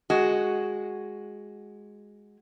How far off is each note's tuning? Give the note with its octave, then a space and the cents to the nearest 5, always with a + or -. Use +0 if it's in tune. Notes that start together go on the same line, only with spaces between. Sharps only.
G#3 +0 F#4 +0